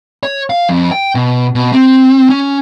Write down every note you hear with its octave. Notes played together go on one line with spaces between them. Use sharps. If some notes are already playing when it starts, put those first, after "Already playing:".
C#5
F5
F2
G5
B2
B2
C4
C#4